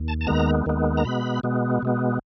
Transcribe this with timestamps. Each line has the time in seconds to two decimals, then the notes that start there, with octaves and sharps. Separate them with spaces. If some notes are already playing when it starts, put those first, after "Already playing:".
Already playing: D#2
0.08 A5
0.21 A5
0.27 D#2 D#3 G#3 B3 A#5
0.66 D#2 D#3 G#3 B3
0.97 A#5
1.04 B2 G#3 B3 B5
1.43 B2 G#3 B3
1.82 B2 G#3 B3